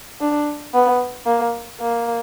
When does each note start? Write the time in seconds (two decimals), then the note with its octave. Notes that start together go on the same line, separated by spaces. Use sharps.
0.21 D4
0.74 B3
1.26 A#3
1.80 A#3